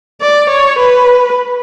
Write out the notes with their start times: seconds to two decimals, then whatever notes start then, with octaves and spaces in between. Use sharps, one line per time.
0.21 D5
0.50 C#5
0.79 B4